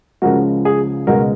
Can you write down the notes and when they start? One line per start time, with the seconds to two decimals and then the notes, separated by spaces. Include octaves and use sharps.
0.22 C#2 C#3 F3 G#3 F#4 A#4
0.65 G#4
1.07 C#2 B2 G#3 F#4 A#4